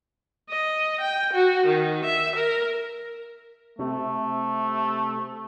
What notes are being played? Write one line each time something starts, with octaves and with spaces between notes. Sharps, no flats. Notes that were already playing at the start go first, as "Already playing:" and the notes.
D#5
G5
F#4
D#3
E5
A#4
C3 A3